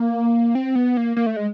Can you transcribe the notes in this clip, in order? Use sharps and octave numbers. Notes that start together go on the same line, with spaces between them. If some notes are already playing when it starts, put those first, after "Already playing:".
Already playing: A#3
C4
B3
A#3
A#3
A3
G#3